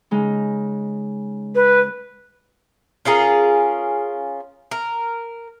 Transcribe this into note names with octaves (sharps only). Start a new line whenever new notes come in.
C#3 G#3 D#4
B4
C#4 F4 G#4 A#4
A#4